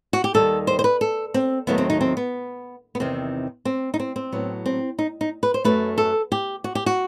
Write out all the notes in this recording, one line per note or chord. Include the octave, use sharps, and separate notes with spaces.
F#4
G4
D#2 D#3 G3 A4
C5
C5
B4
A4
C4
D#2 D#3 F#3 A3 B3
C4
D#4
C4
B3
B3
E2 C3 D#3 C4
C4
D#4
C4
C4
A2 F#3 B3
C4
D#4
D#4
B4
C5
F#2 F#3 A3 B4
A4
G4
F#4
G4
F#4